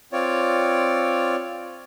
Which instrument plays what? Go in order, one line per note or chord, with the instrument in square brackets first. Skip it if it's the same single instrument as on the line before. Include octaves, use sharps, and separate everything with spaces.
[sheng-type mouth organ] C4 F4 C#5 D5